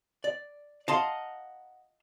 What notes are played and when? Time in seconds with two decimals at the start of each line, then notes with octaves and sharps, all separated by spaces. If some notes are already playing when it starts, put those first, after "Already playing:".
0.24 D5
0.88 D#5 F5 F#5 A5 A#5 C6